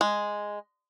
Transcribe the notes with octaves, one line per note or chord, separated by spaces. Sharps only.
G#3